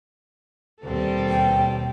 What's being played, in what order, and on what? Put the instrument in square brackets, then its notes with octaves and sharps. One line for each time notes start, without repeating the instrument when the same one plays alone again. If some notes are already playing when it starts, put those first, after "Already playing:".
[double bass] D#2 B2 [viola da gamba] G3 C4 A4
[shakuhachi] G5